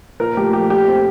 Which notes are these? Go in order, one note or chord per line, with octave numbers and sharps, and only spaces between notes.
A#2 A#4
A3 G4
F3 G4
A#2 G4
C4